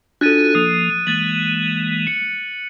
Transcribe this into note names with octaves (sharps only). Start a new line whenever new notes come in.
D4 F4 F#4 A4 F#6 A6 D#7
F3 A#3 D#6
E3 G#3 A#3 F#6 A6 F#7
C#7